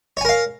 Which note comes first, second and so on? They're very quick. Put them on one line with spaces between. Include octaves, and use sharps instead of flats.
C#5 G#5 A#4 F5